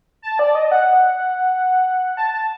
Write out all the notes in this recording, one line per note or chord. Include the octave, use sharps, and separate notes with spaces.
A5
D5
D#5
F#5
A5
A5